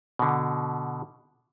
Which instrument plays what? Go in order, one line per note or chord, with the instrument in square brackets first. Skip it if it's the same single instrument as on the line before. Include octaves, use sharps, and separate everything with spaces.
[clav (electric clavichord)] B2 D3